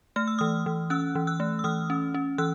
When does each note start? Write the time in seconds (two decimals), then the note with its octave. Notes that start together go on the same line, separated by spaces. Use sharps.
0.16 A3 F6
0.28 E6
0.39 E3 D#6 F6
0.66 E3
0.90 C#4 E6 F#6
1.15 E3
1.27 E6 F#6
1.40 A3
1.59 E6
1.64 E3 D#6 F6
1.90 C#4
2.14 C#4
2.38 E3 E6 F#6